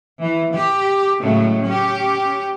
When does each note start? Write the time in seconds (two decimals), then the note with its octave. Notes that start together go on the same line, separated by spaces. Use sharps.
0.20 E3
0.53 G4
1.20 A2 C#3 F#3 G#3 A3
1.64 C#4 G4